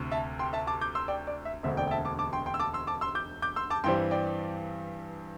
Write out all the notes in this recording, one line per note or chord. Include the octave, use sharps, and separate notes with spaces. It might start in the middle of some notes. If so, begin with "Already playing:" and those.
Already playing: D2 C3
E5 A5
G5 C6
E5 A5
A5 D6
D6 G6
C6 E6
D5 G5
D5
E5
E1 D2 D3 C4 E5
D5 G5
G5
E5 A5
A5 D6
A5 D6
G5 C6
G5 C6
E6
A5 D6
C6 E6
A5 D6
C6 E6
D6 G6
D6 G6
C6 E6
A5 D6
G2 E3 G3 C4 G5 C6
D5 G5